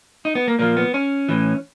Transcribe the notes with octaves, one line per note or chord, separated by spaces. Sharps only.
D#4
B3
A#3
A#2 F3 A#3
B3
C#4
A2 E3